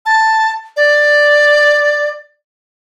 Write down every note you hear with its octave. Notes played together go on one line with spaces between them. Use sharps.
A5
D5